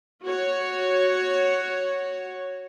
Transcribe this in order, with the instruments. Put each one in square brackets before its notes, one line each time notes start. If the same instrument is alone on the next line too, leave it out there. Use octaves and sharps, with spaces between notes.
[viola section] F#4 C#5